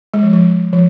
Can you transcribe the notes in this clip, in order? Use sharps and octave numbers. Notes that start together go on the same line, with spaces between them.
G#3
F3
F3
F3